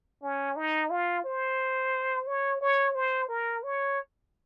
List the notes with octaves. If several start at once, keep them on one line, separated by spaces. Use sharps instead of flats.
C#4
D#4
F4
C5
C#5
C#5
C5
A#4
C#5